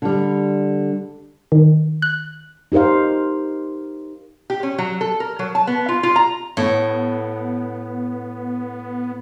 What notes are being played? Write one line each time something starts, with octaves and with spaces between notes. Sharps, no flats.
D3 G3
D#3
F#6
D#4 G4 A#4 C5 F5
G4
C#4
F#3
A4
A#4
F#3
A5
B3
F4
F4
A#5
A2 B3